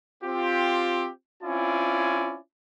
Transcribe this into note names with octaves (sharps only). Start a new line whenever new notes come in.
C4 F4 G4
C4 C#4 E4 F4 D5 G#5